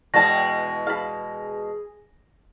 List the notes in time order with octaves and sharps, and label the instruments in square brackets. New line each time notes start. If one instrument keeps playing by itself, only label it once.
[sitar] E2 B2 G#3 [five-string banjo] F#4 A5 [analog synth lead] G5 [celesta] A#6
[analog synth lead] G#4 [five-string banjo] F5 A5 B5